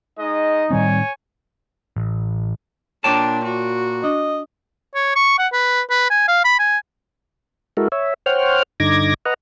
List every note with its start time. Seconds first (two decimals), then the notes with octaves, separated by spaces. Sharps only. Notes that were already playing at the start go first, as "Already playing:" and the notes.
0.19 G#3 D#4 D#5
0.71 A2 D#3 G3 C4 C#5 G#5
1.96 A1
3.04 A#2 D4 C#5 G5 A5 D6
3.44 F#4
4.03 D4 D#5
4.95 C#5
5.15 C#6
5.39 F#5
5.53 B4
5.90 B4
6.10 G#5
6.28 F5
6.44 B5
6.59 G#5
7.77 G#3 E4 F#4 A4 A#4
7.92 C#5 E5
8.26 C5 C#5 F#5 G5 F6
8.80 G2 D3 D#4 D6 G#6 A#6
9.25 B4 D#5 F#5 A#5